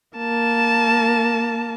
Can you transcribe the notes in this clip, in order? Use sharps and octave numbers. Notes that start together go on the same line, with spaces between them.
A#3 A5